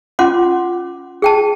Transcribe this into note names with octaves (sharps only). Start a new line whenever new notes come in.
C#4 F4 F#5 C6 D6
G#4 G5 A5